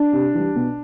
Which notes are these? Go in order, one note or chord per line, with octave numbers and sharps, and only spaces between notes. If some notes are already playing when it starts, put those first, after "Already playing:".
Already playing: D4
C3
E3 G3
B2